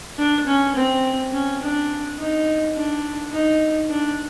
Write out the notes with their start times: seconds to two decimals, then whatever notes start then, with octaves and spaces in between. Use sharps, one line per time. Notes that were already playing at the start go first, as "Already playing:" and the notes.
0.18 D4
0.47 C#4
0.75 C4
1.33 C#4
1.61 D4
2.19 D#4
2.76 D4
3.33 D#4
3.90 D4